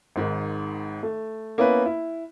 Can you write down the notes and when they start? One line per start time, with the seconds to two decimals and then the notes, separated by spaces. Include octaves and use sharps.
0.16 G#1 G#2 D#3
1.03 A3
1.58 A#3 B3 C#4 E4 B4
1.86 E4